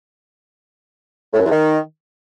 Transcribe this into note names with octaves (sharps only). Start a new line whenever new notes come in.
A2
F#2
E2
D#3